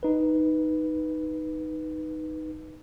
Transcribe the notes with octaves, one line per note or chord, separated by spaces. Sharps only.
D#4 B4